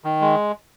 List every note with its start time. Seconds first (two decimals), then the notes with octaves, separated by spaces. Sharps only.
0.04 D#3
0.21 G#3